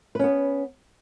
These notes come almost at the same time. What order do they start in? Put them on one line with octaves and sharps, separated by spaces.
B4 C#4 B3